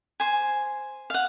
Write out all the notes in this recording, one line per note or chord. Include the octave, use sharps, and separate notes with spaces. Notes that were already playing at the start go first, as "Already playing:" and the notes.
C5 G#5
F5 F#5